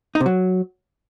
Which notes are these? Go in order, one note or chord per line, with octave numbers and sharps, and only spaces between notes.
D#4
C3
F#3